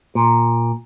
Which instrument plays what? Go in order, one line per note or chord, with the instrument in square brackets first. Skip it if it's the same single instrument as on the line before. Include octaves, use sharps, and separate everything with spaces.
[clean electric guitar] A#2